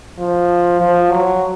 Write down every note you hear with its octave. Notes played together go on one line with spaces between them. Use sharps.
F3
F3
F#3